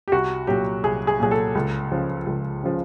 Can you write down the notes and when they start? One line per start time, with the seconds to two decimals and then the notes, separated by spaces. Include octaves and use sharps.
0.08 G4
0.12 C2 F#4
0.47 A#2 F#3 G4
0.83 C2 G#4
1.07 G#4
1.20 A#2 F#3 G#4
1.31 A4
1.55 C#2
1.92 C#3 F3
2.27 C#2
2.63 C#3 F3